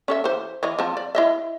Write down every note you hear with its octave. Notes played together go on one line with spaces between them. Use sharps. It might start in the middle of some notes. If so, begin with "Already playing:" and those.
C#4 A4 E5
E3 C5
E3 C#5 D#5
F3 C4 A5
D5
E4 D#5 E5